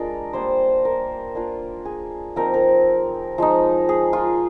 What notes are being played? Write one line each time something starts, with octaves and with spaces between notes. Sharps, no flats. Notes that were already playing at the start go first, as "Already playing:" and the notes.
Already playing: G#3 D4 F4 A#4 D5
G3 A#3 D4 C5
A#4
A#3 D4 F4
G#4
F3 C4 D#4 A#4
A#4
F3 G#3 D#4
G#4
F4